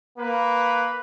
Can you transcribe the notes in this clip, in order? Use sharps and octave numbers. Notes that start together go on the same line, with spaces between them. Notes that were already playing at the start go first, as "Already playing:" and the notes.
A#3 B4